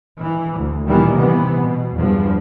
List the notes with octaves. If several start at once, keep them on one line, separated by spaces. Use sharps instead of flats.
E3
D2
A#2 D#3 E3 G3 B3
C3 E3 B3
B2
E2 G2 F3